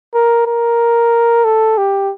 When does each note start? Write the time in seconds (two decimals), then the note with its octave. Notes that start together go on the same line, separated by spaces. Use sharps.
0.14 A#4
0.47 A#4
1.45 A4
1.78 G4